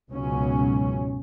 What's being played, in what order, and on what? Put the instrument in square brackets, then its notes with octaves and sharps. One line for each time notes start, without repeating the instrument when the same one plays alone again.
[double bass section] C#2 G#2 B2 F#3 C#4